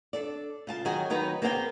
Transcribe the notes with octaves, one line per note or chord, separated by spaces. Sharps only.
D4 A4 D5
C#3 F4 A5
D#3 F#3 F#4 G#4 D#5 G#5
D#3 F#3 D#4 B4
A#3 B3 G#4 C5 F5 G5